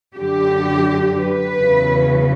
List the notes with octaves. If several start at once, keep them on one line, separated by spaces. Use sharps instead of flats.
F#2 D3 F#3 G4
B4
E2 C#3 F#3